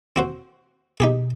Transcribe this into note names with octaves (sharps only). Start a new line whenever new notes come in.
C4 F#4 C5
B2 D#4 G4 G#4